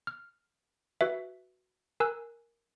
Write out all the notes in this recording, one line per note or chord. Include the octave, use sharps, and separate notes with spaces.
F6
F#4 B4 E5
A#4 G#5 E6 F#6